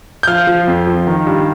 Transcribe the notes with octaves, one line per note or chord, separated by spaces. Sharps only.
G6
F3 F5 F6
F3
F2
F3
D#3
G2